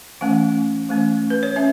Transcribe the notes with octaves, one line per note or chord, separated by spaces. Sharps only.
E3 A3 C#4 F#5
E3 A3 C#4
B4
C#5
C#4 E5